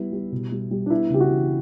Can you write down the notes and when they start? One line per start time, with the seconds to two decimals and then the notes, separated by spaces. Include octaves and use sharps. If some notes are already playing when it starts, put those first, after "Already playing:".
Already playing: G3 B3 E4
0.13 G3
0.32 B2
0.52 G3
0.71 G3
0.86 D4
0.90 B3 E4
1.10 C#3 G4
1.20 F#4
1.30 E3